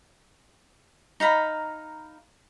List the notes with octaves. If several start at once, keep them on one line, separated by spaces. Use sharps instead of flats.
D#4 F5 A#5 B5